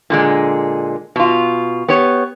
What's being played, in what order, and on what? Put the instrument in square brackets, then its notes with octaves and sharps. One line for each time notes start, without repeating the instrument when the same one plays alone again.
[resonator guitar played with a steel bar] A#2 D3 G#3
B2 F4
B3 G4 C#5